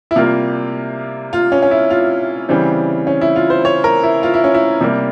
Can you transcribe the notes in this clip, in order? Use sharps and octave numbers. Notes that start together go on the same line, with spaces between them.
E4
C3 G3 A#3 F4
F4
C#4
C#4
E4
F4
C#3 E3 G3 C4
C#4
E4
F4
C5
C#5
A#4
E4
F4
E4
C#4
E4
C3 G3 A#3